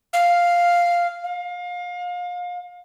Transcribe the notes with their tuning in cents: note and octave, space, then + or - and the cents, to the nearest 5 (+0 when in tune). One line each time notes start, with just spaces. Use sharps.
F5 +0
F5 +30